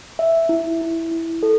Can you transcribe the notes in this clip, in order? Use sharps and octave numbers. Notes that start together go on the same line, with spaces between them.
E5
E4
E4
E4
A4